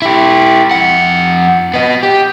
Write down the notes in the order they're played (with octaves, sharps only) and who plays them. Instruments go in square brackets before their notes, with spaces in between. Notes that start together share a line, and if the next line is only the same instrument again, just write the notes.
[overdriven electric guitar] E4 G4
F2 F#5
B3 D#5
G4